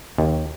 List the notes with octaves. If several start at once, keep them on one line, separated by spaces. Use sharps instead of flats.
D#2